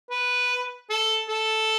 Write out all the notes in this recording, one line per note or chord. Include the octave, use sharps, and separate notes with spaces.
B4
A4
A4